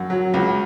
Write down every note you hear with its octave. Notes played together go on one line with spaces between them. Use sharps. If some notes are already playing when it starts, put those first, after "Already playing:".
Already playing: F#2
F#3
C#2